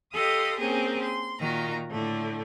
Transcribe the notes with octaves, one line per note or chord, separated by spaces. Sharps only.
G4 A4 D#5 F5 C6 D#6
A#3 C4 C#4 G4 G#4 A#4
C6
A#2 D#3 F4 F#4 A#5
A2 D3 A3